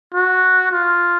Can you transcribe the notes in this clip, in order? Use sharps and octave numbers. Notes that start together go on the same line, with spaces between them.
F#4
F4